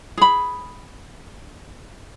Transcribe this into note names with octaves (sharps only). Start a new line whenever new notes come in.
G#4 B5